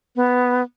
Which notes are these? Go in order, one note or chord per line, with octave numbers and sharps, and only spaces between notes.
B3